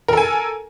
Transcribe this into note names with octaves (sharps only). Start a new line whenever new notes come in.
A4 A#4 G#5